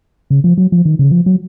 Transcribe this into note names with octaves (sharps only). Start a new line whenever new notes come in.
C#3
F3
F#3
F3
D#3
C#3
F3
F#3